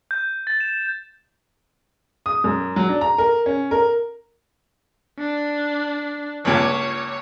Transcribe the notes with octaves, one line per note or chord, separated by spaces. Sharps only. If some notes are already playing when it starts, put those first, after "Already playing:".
G6
A6
E7
D#6
F#2
F#3
D4
A#5
A#4
C#4
A#4
D4
C#2 G2 A#2 C#5